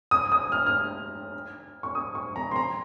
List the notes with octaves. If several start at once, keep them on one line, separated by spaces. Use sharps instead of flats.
D#6
D#6
F6
F6
C#6
D#6
C#6
A#5
C6
A#5